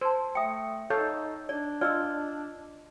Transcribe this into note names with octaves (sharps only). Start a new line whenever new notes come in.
C5 A5 E6
A3 E5 G5 D#6 C#7
D#4 A4 C#5 F5 G6
D4 D5
F4 D5 D#5 E6 F6